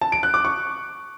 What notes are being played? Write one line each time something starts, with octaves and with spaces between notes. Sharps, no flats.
A5
D7
F#6
D6
C#6